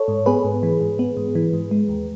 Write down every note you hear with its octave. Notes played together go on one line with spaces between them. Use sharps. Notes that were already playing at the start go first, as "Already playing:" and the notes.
Already playing: A4 C#5
G#2
B3 G#4 B4
G#2
E3
G#2
B3
G#2
E3
G#2
G#3
D#2